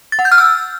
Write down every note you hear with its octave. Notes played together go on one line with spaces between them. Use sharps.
A6
F#5
G6
F6
E6